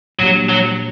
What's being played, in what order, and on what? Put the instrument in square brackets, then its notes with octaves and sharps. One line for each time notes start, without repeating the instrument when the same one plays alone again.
[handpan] A#2 G3 A#3 D4 G4 [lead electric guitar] F#3
[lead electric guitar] F#3